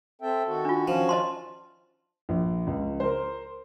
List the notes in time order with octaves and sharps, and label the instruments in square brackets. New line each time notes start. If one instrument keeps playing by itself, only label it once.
[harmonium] C4 E5 G5 [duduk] A4
[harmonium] D#3 F#4
[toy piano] D4 F4
[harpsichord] F3 [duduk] C#4
[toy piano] D#5 A5 C6
[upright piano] A#1
C#2
A#4 C5